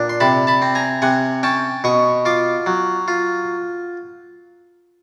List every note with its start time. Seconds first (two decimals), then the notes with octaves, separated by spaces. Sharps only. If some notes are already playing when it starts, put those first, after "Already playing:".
Already playing: A#2 D4
0.10 C6
0.20 C3 A5 B5
0.47 A5 B5
0.62 C4
0.75 G#5 A#5
1.02 C3 F#5 G#5
1.43 C#4 G5 A5
1.84 B2 C#6 D#6
2.25 F4 C6 D6
2.66 F#3
3.08 F4